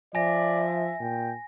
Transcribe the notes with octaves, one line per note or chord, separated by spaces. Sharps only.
F3 D5 E5 G#5 A#6
A#2 G5